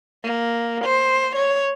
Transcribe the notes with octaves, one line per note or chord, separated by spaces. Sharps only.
A#3
C5
C#5